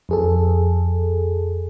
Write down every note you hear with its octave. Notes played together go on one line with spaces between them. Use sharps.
F2 G#4 A4